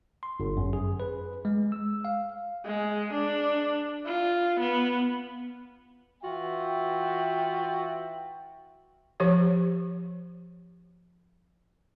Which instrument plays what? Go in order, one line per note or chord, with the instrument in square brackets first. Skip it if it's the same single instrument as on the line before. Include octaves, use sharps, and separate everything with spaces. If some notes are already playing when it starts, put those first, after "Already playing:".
[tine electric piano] C6
G1
F#2
G#4
B4
G#3
E6
F5
[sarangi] G#3
D4
F4
B3
[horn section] E3 F4 F#4 E5 G5
[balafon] F3 G4 C#5